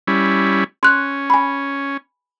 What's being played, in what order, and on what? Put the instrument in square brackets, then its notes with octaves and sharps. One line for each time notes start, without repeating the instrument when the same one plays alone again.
[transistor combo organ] G3 C#4 E4
[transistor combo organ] C#4 [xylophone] C6 F#6
[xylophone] G#5 B5